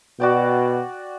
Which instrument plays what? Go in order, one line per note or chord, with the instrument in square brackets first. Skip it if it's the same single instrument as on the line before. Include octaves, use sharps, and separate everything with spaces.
[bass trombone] B2 [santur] F#4 D5 G5